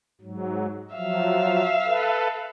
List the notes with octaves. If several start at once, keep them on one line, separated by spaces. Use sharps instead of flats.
G#2 F#3
F3 F#3 E5 F5
A4 B4